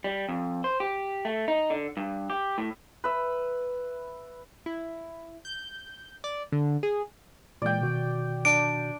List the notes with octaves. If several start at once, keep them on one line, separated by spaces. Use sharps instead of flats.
G3
F2
C5
G4
A3
D#4
D3
G2
G4
A2
B4 E5
E4
G6
D5
D3
G#4
A#2 E3 G#3 D5 G5
B2 D#3 F#4
D4 D7